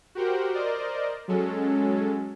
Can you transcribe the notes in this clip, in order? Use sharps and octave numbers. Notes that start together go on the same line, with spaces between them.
F#4 G4 A#4 C5 F#5 G5
A#4 C5 D5 D#5
F#3 G#3 C#4 A4